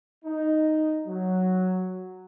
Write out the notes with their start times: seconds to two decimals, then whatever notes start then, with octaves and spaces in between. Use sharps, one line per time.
0.24 D#4
1.06 F#3